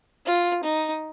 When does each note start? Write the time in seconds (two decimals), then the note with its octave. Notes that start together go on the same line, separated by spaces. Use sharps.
0.26 F4
0.63 D#4